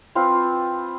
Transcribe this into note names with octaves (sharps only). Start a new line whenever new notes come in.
C4 F4 B4